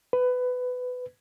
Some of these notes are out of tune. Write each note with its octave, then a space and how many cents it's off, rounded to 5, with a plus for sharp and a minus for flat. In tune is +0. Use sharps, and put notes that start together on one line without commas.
B4 +20